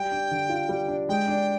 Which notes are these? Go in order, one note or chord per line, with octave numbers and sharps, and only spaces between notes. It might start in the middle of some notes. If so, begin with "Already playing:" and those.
Already playing: G3 G5
D4
D3
F4
G3
D4
G#3 G5
D4